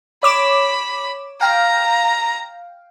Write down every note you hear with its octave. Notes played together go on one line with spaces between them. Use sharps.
C#5 B5 D6 E7
F5 G5 A#5